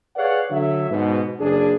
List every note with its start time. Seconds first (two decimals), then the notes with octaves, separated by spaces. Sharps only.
0.16 G#4 B4 C#5 D5 F5 F#5
0.50 D3 F#3 E5
0.90 G#2 B2
1.39 F#1 D4 G#4